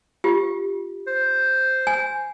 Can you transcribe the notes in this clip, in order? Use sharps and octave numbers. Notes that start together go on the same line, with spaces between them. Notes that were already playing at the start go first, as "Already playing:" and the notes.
F4 G4
C5
G#5